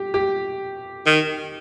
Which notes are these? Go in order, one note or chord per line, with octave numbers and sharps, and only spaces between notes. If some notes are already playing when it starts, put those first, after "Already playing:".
Already playing: G4
G4
D#3